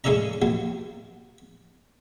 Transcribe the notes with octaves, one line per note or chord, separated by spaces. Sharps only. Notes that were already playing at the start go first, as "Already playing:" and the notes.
G#3 C#4 E4 A4 D5 A#5
D#2 F#3